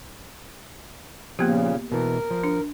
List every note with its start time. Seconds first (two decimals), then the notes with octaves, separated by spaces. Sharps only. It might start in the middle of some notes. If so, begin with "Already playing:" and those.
1.39 A#2 C#3 F3 A#3 B3 G4
1.92 B2 E3 A#4
2.31 F3
2.44 D4